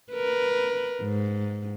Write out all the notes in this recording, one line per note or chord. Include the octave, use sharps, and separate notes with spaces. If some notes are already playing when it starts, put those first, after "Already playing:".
A#4 B4
G#2